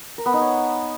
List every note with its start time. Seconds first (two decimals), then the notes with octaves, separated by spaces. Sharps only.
0.18 A#4
0.26 B3
0.33 D#4
0.41 C#5